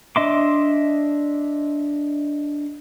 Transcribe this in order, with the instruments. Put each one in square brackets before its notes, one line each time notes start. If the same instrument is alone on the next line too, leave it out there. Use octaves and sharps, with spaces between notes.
[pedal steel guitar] D4 D#5 E5 C6 D6